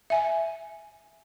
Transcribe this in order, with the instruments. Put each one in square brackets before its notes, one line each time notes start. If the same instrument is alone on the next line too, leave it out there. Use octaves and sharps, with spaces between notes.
[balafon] E5 G#5